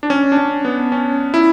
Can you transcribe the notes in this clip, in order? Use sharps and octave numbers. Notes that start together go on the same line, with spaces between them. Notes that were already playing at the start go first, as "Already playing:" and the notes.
D4
C#4
D4
C#4
B3
C#4
E4